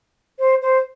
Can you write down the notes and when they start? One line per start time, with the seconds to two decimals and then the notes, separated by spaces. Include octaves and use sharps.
0.39 C5
0.62 C5